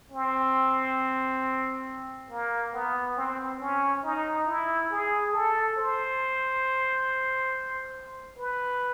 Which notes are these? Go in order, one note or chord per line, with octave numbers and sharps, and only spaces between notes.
C4
A#3
B3
C4
C#4
D#4
E4
G#4
A4
C5
B4